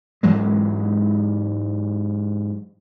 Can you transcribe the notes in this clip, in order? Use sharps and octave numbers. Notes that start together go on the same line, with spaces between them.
G#2 E3 F#3 G#3